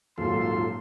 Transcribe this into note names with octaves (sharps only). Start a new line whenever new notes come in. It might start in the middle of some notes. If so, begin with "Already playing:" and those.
D#1 G#2 F#3 F4 A4 C6